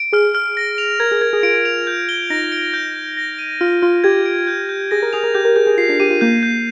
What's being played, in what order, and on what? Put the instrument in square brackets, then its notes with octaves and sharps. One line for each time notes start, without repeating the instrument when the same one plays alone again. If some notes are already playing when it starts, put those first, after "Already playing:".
Already playing: [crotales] D7
[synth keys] G#4 [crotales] F6
[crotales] F6
A#6
F7
[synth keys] A#4 [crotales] G#6
[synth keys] G#4
[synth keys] A#4 [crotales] G#6
[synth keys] G#4
[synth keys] F4 [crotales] D7
[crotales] F7
G6
G7
[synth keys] D#4 [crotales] A#6
[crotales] D7
G6
G6
A#6
D#7
[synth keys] F4 [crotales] F6
[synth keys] F4 [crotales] F6
[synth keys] G4 [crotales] G#6
[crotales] D7
G6
G6
[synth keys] G#4 [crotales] A#6
[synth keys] A#4
[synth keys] G#4 [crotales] F7
[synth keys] A#4
[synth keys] G4 [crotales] G6
[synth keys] A#4
[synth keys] G#4 [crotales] G6
[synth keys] G#4
[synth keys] F4 [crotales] C7
[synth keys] D4
[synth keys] G4 [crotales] D#7
[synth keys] F4
[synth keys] A#3 [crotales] G6
[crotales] G6